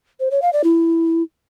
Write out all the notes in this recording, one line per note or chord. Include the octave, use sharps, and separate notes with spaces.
C5
C#5
F5
D5
E4